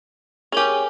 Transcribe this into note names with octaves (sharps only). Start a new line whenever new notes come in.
C#4 G4 G#4 A#4 G#5